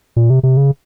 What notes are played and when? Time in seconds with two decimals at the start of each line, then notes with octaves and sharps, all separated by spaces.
0.16 A#2
0.30 C3
0.43 C3
0.57 C#3